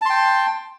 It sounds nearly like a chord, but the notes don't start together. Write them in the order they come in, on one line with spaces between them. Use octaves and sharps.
A5 C6 G5